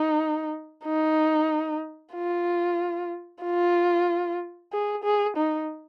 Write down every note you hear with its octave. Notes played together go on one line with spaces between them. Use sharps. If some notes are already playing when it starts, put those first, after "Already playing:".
Already playing: D#4
D#4
F4
F4
G#4
G#4
D#4